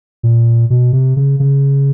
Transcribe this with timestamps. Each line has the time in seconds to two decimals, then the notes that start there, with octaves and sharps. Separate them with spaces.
0.23 A#2
0.70 B2
0.93 C3
1.16 C#3
1.40 C#3